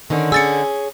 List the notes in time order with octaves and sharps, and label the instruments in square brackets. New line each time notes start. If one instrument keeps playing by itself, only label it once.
[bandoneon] D3 [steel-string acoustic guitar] D#3 C#4 D4
[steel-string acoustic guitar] C#4 G#4 [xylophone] E6 A6 C#7